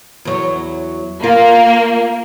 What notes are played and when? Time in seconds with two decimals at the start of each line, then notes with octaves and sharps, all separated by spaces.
0.25 E2 F#3
1.23 A#3 F4